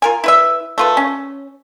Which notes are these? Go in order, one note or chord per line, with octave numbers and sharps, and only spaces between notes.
F4 A#4 G#5
E4 B4 E5
A3 F4 B4
C#4